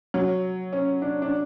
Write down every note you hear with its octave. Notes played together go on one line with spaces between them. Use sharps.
F#3
C#4
D4
D4